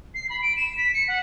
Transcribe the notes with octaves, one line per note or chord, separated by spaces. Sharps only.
C7
B5
D7
E7
B6
C#7
F#5